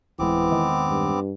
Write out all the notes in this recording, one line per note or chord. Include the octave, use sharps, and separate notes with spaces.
D1 E3 G#3 B3 C4 D6
E1 D#3 G#3
G2